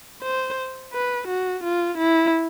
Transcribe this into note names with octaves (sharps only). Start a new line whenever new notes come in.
C5
B4
F#4
F4
E4